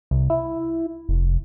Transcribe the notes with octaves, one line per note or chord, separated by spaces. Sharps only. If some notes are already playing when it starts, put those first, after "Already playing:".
C2
E4
F1